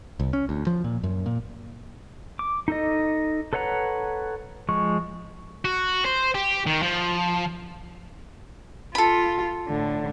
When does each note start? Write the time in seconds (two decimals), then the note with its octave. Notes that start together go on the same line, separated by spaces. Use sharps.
0.20 C2
0.33 C#4
0.49 D2
0.67 F3
0.84 A#2
1.03 F#2
1.26 A#2
2.39 D6
2.68 D#4 A4 D#5
3.53 A4 B4 C#5 F#5 A#5
4.69 F3 G#3 C#6
5.65 F#4
6.06 C5
6.35 G4
6.67 D#3
6.82 F3
8.95 F4 A4 B5
9.68 A2 D3